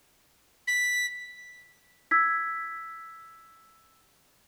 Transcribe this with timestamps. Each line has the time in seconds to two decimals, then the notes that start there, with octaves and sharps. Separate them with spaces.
0.67 B6
2.11 E6 G#6 B6